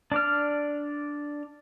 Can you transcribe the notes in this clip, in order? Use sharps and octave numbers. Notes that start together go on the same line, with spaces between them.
D4 D5 F6